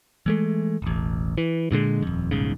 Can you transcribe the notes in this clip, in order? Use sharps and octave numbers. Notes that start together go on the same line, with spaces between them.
E3 G#3 A3
E1 A1
E3
G2 A#2 D3 G#3
D#1 F2
D#1 B1 G#2 C#3